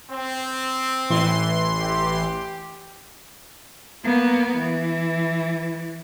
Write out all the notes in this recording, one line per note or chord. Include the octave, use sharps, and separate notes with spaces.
C4
A1 E3 C6
G4
A#3 B3
E3